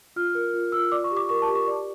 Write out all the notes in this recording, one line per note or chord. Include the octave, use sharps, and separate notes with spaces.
F4 F6
A#4
F4
F4 E6
D5 D6
C#6
G4
D6
A#4 C#6
A5
G4
C#6
D5